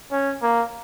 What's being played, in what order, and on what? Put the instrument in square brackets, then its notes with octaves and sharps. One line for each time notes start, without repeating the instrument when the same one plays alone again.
[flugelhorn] C#4
A#3